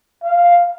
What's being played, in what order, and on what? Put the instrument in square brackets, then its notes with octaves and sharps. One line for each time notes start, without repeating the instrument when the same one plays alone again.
[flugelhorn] F5